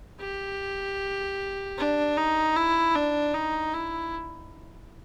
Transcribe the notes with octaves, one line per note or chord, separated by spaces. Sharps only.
G4
D4
D#4
E4
D4
D#4
E4